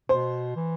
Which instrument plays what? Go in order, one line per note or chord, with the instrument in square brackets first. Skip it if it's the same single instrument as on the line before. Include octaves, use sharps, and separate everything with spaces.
[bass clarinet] B2 [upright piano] C5
[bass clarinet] E3